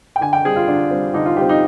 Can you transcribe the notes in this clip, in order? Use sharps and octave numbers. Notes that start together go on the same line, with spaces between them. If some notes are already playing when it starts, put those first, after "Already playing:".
G5
D3 G#5
G5
G3 C4 G#4
F4
D3 D4
G3 C4
D3 D#4
F4
G3 C4 G4
D#4